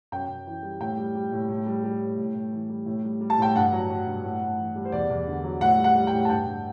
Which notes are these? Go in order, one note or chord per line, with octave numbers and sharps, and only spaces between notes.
F#2 G5
F#2
E3
G3
A2 G5
G3
G3
A2
A2
G3
G3
A2
A2
A2
E3
G3
A2
G3
G3
A5
A2 G5
G2 F#5
F#3
F#3
G2
A2
A2
E3
G3
C5
E2 D5
E2
D3
F#3
A2 F#5
G3
F#5
G3
G5
A2
A5
G2 G5
G2